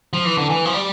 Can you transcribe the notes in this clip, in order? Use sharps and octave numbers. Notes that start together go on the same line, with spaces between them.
F3
E3
D3
E3
F3
G3